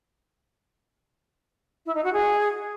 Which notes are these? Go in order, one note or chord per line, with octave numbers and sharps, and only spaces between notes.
E4
D#4
F#4
G#4